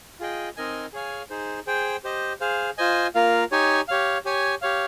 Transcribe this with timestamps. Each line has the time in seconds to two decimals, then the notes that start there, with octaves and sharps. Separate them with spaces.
0.20 F4 G#4 D#5 G5
0.57 C4 D#4 A#4 D#5 G#5
0.93 G#4 C#5 F5 G#5
1.30 D#4 G#4 C5
1.67 G#4 C5 G5
2.04 G4 C5 D#5
2.40 G#4 C5 F5
2.78 F4 C5 D#5 G#5
3.15 A#3 F4 A#4 F5
3.51 D#4 G4 C#5 G#5
3.88 G4 C#5 F5
4.25 G4 C#5 G#5
4.62 G4 C#5 F5